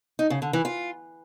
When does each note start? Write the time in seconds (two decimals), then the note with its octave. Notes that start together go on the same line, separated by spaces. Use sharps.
0.19 D#4
0.30 C#3
0.42 D3
0.53 E3
0.65 F4